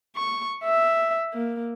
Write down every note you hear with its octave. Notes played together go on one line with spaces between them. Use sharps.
C#6
E5
A#3